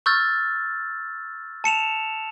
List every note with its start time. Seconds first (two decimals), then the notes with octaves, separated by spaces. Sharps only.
0.06 C#6 E6 F6 G6 A6
1.64 A5 C#7 E7 F7